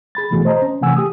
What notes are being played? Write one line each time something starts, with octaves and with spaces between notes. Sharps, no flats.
G#4 B5 A6
G#2 B2 E3 A3 F#4 G#4
C5 D#5 A5 A#5
C#4
C3 E3 A3 F#5 G#5 E6
G4 D#6